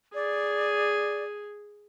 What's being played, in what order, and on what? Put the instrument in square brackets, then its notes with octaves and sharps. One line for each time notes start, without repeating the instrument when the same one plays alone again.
[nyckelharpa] G#4 [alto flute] D5